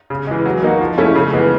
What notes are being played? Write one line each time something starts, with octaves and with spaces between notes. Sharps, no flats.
C#3
E3 G#3
F#3
A#3 D#4 F#4
F3
A3 C#4 E4
C#3
E3 G#3 B3